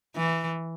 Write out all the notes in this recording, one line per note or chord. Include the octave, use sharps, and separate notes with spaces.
E3